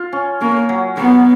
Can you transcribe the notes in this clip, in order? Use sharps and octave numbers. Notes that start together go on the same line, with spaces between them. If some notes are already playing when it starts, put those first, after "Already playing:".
Already playing: F4
C#4
A#3 C#4
F#3
F#3 B3